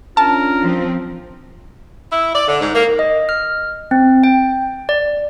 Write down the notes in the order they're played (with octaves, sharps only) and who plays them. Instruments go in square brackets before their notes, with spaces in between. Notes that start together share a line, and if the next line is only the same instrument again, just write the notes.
[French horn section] C#4 D4 F4 [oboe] A#4 [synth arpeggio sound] A5
[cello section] F3 C4
[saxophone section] E4
D5
D3
G#2
A#3
[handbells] D#5
F6
C4
G5
D5